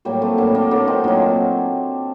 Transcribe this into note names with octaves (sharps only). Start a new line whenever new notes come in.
A2 F#3 G3 A#3
A3 C4
A2 F#3 A#3 D4
A#3 D4
A2 F#3 A#3 D4
C4 D#4
A#2 F#3 A#3 D4